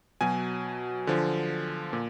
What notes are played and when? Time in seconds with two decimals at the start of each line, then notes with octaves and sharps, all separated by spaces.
0.21 B2 F#3 G#5
1.07 D3 F3
1.93 A#2